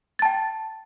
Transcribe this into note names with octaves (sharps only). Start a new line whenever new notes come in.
G5 A5 A6